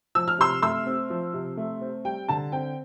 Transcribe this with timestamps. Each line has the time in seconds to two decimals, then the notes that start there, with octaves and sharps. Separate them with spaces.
0.15 F3 E6
0.28 F6
0.39 C3 C6 E6
0.62 A3 C6 E6
0.86 C4
1.10 F3
1.34 C3
1.57 A3
1.81 C4
2.05 G3 G5
2.28 D3 A5
2.52 C4 G5